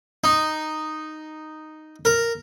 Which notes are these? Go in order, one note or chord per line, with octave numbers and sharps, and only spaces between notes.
D#4
A#4